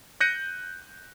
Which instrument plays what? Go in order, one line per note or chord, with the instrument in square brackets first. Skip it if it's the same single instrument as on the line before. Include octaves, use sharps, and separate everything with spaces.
[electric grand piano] F#6 G6 A#6 C#7 D#7